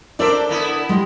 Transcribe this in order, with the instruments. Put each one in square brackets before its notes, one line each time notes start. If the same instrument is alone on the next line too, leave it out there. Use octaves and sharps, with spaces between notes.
[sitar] D4 C5 E5 [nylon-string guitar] A4 A#4 D5
[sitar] D3 B3 E4
[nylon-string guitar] G3 G#3